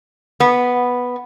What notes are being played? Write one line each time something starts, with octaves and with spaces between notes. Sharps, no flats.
B3